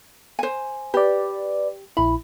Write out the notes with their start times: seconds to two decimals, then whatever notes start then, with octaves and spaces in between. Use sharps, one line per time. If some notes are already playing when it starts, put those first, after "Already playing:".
0.39 C5 G#5
0.94 G4 B4 D5
1.97 A#1 E4 B5